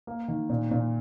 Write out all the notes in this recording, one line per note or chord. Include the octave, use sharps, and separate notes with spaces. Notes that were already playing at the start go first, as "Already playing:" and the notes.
A#3
D#3
A#2
A#2